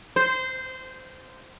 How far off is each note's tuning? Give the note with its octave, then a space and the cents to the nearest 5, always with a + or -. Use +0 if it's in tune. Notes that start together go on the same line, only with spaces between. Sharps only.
C5 -20